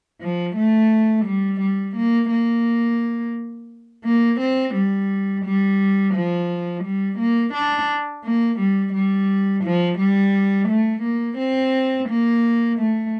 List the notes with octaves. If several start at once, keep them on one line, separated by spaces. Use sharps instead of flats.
F3
A3
G3
G3
A#3
A#3
A#3
C4
G3
G3
F3
G3
A#3
D4
A#3
G3
G3
F3
G3
A3
A#3
C4
A#3
A3